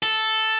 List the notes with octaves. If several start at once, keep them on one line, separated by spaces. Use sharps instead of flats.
A4